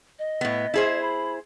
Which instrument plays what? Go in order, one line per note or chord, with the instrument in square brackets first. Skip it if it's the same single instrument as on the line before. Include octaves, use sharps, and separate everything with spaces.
[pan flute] D#5
[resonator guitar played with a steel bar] A2 B3
E4 G#4 C5
[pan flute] B5